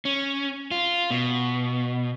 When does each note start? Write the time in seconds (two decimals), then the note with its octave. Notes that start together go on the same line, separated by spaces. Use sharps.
0.05 C#4
0.71 F4
1.11 B2